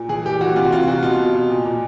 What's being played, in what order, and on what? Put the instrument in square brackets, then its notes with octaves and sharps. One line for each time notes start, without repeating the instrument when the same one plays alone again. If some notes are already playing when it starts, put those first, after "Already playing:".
Already playing: [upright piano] A#2
E3 G#4
E3 G4
E3 F#4
C3 F4
F#4
C3 F4
C3 F#4
B2 F4
B2
B2
A#2
A#2